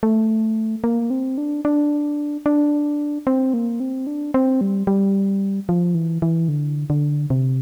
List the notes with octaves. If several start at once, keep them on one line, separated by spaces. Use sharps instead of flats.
A3
A#3
C4
D4
D4
D4
C4
A#3
C4
D4
C4
G3
G3
F3
E3
E3
D3
D3
C3